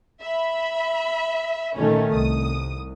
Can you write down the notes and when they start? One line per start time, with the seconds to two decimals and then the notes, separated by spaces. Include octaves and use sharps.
0.20 E5 B5
1.77 A#2 D#3 A3 C#4
2.14 C2 D#6